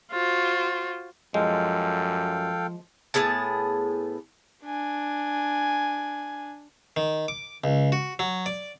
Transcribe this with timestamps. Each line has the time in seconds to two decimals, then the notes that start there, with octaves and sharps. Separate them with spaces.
0.12 F4 F#4 C5
1.34 F#2 F3 G#3 A4 F5 G5
3.14 A2 B3 G#4 A5
4.64 D4 G#5
6.96 D#3
7.28 D6
7.64 C#2
7.92 F#4
8.19 F#3
8.46 D5